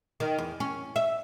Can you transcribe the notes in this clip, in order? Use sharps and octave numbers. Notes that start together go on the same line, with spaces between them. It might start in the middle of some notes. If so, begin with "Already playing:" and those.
D#3
E2
C#4
E5